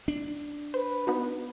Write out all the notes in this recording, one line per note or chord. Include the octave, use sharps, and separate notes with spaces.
D4
B4 C5
B3 D#4 F#4